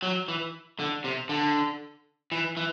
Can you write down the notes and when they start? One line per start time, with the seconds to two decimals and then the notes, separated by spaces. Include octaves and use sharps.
0.03 F#3
0.28 E3
0.79 D3
1.04 C3
1.29 D3
2.32 E3
2.57 E3